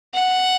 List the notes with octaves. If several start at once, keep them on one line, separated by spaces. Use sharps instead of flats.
F#5